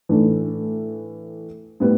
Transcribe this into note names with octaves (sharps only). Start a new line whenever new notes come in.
A2 E3 A3 D4 A4
A2 G3 B3